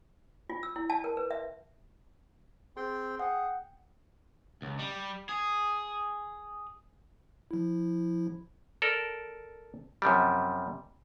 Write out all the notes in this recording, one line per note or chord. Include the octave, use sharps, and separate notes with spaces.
F4
E6
E4
A5
A#4
B4
E5
C4 G#4 G5 C6
G#4 F#5 G5
C#2
G3
G#4
F3 E4
A4 A#4 D5
F#2 C3 F3 G3